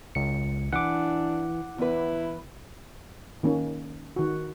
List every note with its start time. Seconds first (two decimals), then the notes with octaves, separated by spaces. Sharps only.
0.15 C#2 C#7
0.73 E3 D4 F#5 D6
1.78 E2 E4 B4
3.43 D#3 A#3 C#4
4.16 D#3 F#4